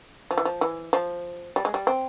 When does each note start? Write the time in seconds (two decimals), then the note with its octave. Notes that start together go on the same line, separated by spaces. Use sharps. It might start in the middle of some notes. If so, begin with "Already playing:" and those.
0.31 F3
0.38 E3
0.45 F3
0.61 E3
0.93 F3
1.56 G3
1.65 G#3
1.74 G3
1.87 C4